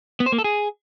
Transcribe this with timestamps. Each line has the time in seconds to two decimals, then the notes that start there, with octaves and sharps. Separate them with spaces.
0.20 B3
0.26 C5
0.32 A#3
0.38 A4
0.44 G#4